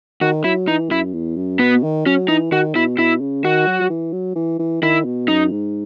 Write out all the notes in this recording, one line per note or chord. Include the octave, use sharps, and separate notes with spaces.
D#3 F#4
F#3 E4
E3 D#4
F#2 E4
E2
F#2
B2 B3
D#3
F#3 C#4
E3 D#4
D#3 F#4
B2 E4
B2 E4
C#3
D#3 F#4
F#3
F#3
E3
F#3
E3
E3
D#3 E4
B2
F#2 D#4
G#2